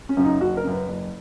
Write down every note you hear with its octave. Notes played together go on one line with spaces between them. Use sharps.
C#4
F#2 C#3
D#4
F#1 F#4
A#4
F#2 C#3
B4
F#1